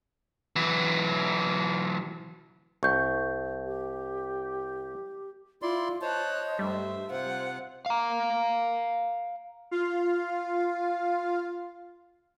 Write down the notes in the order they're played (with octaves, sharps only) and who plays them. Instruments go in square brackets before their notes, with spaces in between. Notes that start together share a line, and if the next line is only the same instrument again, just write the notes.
[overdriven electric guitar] E3 F#3
[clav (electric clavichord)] C2 [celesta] C#6 G6
[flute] G4
[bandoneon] E4 D5 C6 [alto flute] F4
[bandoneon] C5 C#5 [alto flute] D#5 [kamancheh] A5 F#6
[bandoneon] G2 A3 [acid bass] G3 [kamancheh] C5 E5
[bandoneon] C3 [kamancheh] F4 F#5 [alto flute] C5
[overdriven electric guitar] F5 A#5
[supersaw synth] F4 F5